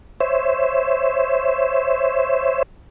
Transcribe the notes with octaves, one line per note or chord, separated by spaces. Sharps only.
C5 C#5 E5